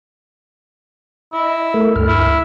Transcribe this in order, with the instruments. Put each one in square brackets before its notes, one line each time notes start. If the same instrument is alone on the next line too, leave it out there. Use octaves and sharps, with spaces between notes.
[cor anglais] E4 [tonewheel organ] D#5
[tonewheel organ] A3 A4 A#4
D2 G2 F6
[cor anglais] E4